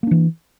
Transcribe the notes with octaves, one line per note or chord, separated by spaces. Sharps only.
E3 A#3 D4